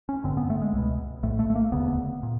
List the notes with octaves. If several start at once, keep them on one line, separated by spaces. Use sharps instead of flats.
C#4
A1 G2 D3 C4
B3
A3
G#3
C#2 B2
A#1 A2 A3
A3
A3
A#3
E1 D2 C#3 B3
A#2